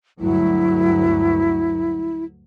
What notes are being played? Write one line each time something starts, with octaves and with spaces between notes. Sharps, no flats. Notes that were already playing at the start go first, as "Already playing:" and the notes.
D2 G2 F#3 E4